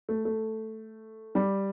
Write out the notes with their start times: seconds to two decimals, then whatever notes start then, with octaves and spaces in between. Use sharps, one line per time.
0.09 A3
0.25 A3
1.35 G3